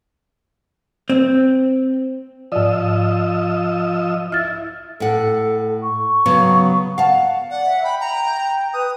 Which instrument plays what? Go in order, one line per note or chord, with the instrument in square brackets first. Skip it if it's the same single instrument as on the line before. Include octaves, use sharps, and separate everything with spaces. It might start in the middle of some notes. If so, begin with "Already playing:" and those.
[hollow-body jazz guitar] C4
[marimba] G#2 D5 [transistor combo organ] F3 D#5 E6
[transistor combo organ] E4 [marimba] F6 A6
[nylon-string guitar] A2 F#5 [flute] A4
[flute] C#6
[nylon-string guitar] C#3 F#3 B3
[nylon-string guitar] F5 A5 [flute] F#5
[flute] D5 [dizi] F#5
[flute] E5
[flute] G5 [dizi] B5
[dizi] A#5
[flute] B4 [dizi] D#6